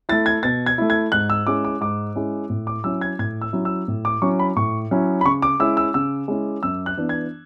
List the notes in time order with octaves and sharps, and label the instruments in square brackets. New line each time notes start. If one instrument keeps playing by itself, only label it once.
[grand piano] E4 A6
A3
G#6
B2 A6
G#6
A3 E4
G#6
G#2 F#6
E6
G#3 C#4 E4 D6
D6
G#2 D6
G#3 C#4 E4
A2
D6
F#3 C#4 E4 E6
G#6
A2 G#6
E6
F#3 C#4 E4
E6
A2
D6
F#3 C#4 E4 C#6
B5
A2 C#6
F#3 C#4 E4
B5
C#3 C#6
D6
G#3 C#4 E4 E6
E6
C#3 E6
G#3 C#4 E4
F#2 E6
F#6
E3 B3 D4
G#6